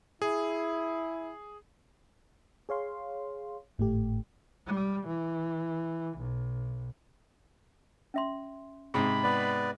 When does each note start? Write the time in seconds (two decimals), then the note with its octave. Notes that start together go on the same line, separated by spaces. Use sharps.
0.22 E4 G#4
2.69 G#4 C#5 F5 C6
3.78 G#1 A2 A3 G4
4.67 G3
5.07 E3
6.18 B1
8.14 C#4 E5 C6
8.94 G#2 C3 G#4 B5 D#6
9.23 B3 B4 D5